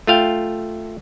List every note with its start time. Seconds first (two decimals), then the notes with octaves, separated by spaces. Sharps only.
0.07 A3 F4 F5 G5